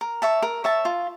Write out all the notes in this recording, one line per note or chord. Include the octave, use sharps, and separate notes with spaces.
A#4
C#5 E5 A5
A#4
C#5 E5 A5
F4